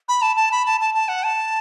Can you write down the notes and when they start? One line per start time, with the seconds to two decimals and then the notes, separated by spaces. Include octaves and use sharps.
0.09 B5
0.22 A5
0.36 A5
0.52 B5
0.66 A5
0.81 A5
0.94 A5
1.08 F#5
1.24 A5